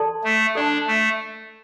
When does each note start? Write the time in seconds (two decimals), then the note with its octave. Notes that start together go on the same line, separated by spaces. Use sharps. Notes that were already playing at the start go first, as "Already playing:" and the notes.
Already playing: A4 D5 A5 C6
0.24 A3
0.55 D4 A4 D5 A5 C6
0.87 A3